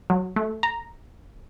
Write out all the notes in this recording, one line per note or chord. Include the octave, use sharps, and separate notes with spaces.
F#3
A3
A#5